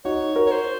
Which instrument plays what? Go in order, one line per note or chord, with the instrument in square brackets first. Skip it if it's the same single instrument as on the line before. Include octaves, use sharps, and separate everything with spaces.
[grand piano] D#4 F#4 [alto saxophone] C#5
[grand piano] F#4 A#4
[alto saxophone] C#5
C5